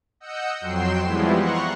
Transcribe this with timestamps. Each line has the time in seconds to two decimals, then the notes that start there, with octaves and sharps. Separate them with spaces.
0.20 D#5 F#5 E6 G6 C#7
0.60 F2 F#3 G5 C6 C7 E7
1.03 E3 F3 G3 G#3 B3 E4
1.35 F#5 A#5 C6 C#6 F#6